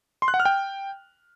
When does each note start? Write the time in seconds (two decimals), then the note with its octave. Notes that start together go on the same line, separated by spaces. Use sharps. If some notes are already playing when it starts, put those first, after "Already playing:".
0.22 C6
0.28 F#6
0.34 F#5
0.40 F6
0.45 G5